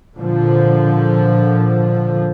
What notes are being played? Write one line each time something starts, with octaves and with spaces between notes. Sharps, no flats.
A#2 D3 F3